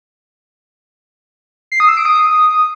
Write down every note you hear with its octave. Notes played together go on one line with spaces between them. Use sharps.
C7
D#6
E6
D7
D#6